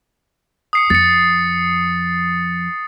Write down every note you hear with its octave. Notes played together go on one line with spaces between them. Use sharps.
D#6 C7 C#7
F2 A6 C#7